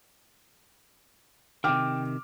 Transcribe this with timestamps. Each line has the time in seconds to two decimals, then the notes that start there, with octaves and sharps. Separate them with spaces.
1.64 C3 D#3 G5 D6 F6